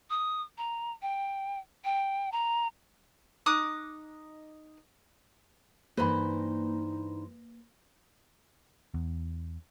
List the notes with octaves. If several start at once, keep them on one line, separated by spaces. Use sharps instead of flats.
D#6
A#5
G5
G5
A#5
D#4 D6 D#6 F#6
G2 E3 A#3 D#4 B4 C5 B5
E2